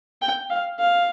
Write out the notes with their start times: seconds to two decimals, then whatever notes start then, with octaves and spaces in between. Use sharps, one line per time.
0.22 G5
0.50 F5
0.79 F5